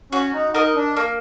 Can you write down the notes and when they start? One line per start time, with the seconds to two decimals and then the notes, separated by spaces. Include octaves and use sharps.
0.12 C#4 F#4
0.33 D#4
0.54 D#4 A#4 D#5
0.76 D4
0.96 A#3